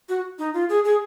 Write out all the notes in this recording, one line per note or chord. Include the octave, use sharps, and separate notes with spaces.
F#4
D#4
F4
G#4
G#4